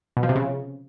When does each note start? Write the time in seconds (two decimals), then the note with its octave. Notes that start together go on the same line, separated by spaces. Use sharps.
0.17 B2
0.23 F3
0.29 C3
0.35 C#3